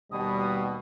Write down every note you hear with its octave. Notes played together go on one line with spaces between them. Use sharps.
D#2 B2 G3 D#6